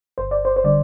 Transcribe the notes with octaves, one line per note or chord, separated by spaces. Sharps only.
G1 C5
D5
C5
C5
D3 G3 D5